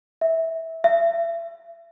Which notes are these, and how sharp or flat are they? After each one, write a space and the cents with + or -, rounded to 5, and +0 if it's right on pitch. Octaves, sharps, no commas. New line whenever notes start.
E5 -15
E5 +30